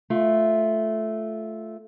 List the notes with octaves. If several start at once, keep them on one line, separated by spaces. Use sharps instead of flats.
A3 F4